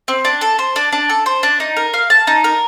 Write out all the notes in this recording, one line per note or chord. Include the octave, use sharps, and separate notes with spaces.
C4
D4
A4
C5
D4
D4
A4
C5
D4
D#4
A#4
F5
A5
D#4
A#4